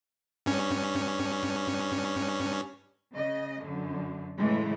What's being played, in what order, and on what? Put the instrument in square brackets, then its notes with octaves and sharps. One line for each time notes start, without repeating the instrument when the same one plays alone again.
[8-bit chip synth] G2 C#4
[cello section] C#3 D#5
F#2 D3
A2 C#3 E3 G#3 A3